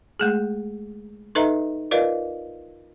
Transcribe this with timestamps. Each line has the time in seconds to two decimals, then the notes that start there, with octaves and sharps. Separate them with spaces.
0.20 G#3 A3 G#4
1.35 D#4 A4 B4 D#5 E5 A#5
1.91 F4 A#4 B4 D5 D#5 F5